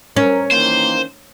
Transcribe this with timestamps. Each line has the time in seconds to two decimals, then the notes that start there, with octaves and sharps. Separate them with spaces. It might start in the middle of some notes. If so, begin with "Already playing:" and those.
0.16 C#4 A#4
0.51 D#3 E3 A#3 C5